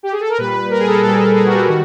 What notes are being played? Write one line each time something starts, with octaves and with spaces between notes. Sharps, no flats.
G4
G#4
A4
A#4
A#2 G3 B4
B4
A#4
G#4
A4
A#2 G3 A4
A4
G#4
F#4
G4
D#3 G3 F#4